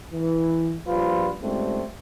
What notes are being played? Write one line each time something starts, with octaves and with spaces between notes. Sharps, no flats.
E3
A#1 F3 G3 F4 B4
C#2 G#2 G3 A3 C4